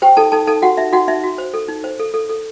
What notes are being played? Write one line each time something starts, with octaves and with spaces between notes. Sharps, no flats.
G4 C5 G5
D#4 A4 A5
D#4 A4 A5
D#4 A4 A5
F#4 G4 F#5
D#4 E5
D#4 F#4 F#5
D#4 E5
F#4
C5
A4
D#4
C5
A4
A4
A4